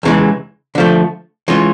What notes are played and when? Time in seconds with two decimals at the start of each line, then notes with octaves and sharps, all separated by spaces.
0.03 E2 C#3 E3 G#3
0.75 D3 F3 A3
1.48 E3 G#3 C#4 F4